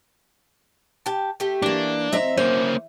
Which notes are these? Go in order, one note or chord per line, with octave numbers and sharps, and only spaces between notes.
G4 A5
A3 G4
E3 A#3 D4
C4 D#5 E5 A#5
A#3 C#4 C5